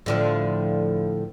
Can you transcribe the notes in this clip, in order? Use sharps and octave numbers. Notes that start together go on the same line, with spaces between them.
A2 D3 F3